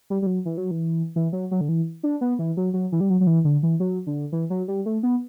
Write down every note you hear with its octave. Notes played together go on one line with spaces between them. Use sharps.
G3
G3
F#3
E3
F#3
E3
E3
F#3
F#3
D3
E3
D4
B3
E3
F#3
F#3
E3
G3
F#3
F#3
E3
D3
E3
F#3
D3
E3
F#3
G3
A3
B3